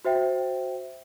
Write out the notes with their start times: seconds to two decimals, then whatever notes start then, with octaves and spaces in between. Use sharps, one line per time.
0.05 F#4 C5 E5 G5